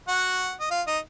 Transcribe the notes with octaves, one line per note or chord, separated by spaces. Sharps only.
F#4 F#5
D#5
F4 F5
D#4 D#5